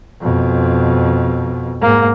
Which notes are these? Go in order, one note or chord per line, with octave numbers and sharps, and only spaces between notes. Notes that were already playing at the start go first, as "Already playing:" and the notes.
F2 B2
G#2 A#3